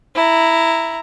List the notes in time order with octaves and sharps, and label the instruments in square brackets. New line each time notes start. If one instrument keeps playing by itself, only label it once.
[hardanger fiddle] E4 A#5